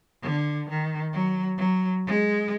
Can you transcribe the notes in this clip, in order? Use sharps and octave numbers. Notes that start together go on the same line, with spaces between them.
D3
D#3
F#3
F#3
G#3